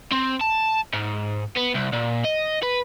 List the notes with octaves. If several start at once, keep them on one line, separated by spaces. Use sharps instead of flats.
C4
A5
G#2
B3
C2
A#2
D#5
B4